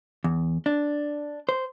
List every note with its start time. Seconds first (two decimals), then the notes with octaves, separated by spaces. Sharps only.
0.24 E2
0.66 D4
1.49 C5